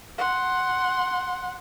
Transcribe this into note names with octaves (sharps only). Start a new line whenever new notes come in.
F#5 C6